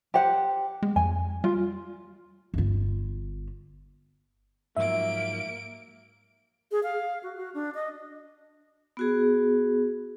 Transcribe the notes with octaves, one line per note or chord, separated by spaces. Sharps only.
G4 C5 F#5
G#3
F2 G#5
G3 F4
G1 F4
G#2 F3 F#3 A#3 E5 D7
G#4
F5
F#4
F#4
D4
D#5
B3 F#4 G#4